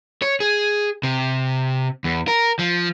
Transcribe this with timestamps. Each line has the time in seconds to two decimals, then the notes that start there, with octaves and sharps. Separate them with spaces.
0.22 C#5
0.40 G#4
1.03 C3
2.04 E2
2.28 A#4
2.59 F3